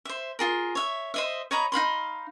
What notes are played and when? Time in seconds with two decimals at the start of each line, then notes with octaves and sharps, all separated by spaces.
0.05 C5 E5
0.39 F4 G#4 A#4
0.75 C#5 E5
1.14 C5 D#5 E5
1.51 C#5 D#5 A#5 B5
1.72 D#4 F5 B5 C6